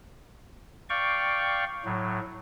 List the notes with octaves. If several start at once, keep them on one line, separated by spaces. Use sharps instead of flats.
D5 F5 G5 C#6
A2 F#3